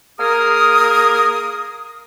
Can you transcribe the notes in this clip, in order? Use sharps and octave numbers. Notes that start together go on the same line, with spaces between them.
A#3 G#4 A#4 D#6